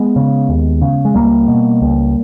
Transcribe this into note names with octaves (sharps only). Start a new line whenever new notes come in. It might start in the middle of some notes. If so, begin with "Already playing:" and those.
Already playing: G#3 B3
C#3
D#2
C#3
G#3
C#2 G3 A#3
B2
C#2